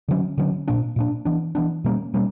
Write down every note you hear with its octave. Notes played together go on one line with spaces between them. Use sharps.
D3 F#3 C#4
D3 F#3 C#4
A#2 A#3 D4
A#2 A#3 D4
E3 B3 D4
E3 B3 D4
B2 G3 A#3 C#4
B2 G3 A#3 C#4